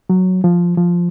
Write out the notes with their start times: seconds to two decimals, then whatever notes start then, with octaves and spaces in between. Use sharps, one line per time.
0.10 F#3
0.44 F3
0.78 F3